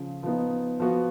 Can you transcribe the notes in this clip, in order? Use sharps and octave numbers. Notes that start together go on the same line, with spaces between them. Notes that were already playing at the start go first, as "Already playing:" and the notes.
Already playing: C#3 F3
F3 B3 D#4
F3 B3 F#4